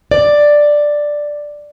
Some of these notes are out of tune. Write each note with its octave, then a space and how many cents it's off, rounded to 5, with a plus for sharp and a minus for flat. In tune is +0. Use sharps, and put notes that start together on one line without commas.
D5 +5